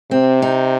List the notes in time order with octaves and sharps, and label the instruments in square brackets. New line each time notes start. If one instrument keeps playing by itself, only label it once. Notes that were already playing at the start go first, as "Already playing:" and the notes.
[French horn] C3 [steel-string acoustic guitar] C4
[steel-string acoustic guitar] D#4